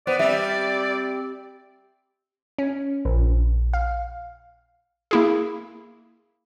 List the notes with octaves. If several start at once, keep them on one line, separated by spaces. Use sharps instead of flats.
B3 C5 D5
G3 C4 E5
C#4
A#1
F5
A#3 E4 G#4